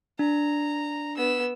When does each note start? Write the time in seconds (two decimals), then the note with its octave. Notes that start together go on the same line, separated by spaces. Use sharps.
0.19 D4 A#5
1.17 B3 E6